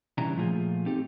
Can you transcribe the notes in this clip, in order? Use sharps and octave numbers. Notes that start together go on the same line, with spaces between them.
C#3 E3 G3 D4 D#4 A#5
A#2 F3 A3 F4 G#4
C4 D#4 G4 A4